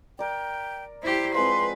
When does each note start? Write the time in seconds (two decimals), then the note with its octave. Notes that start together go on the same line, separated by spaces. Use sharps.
0.19 A#4 D5 G5
1.03 E4 G4 C5
1.34 F3 G#3 C4 B4 C6